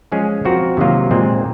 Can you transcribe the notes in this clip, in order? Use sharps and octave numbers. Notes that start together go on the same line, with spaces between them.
F3 G#3 C#4 G#4
F3 C4 F#4 A#4
C3 D#3 F#3 A#3 F4
A#2 G#3 C4